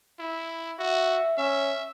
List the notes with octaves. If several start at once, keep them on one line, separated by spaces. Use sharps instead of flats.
E4
F#4 E5
C#4 E5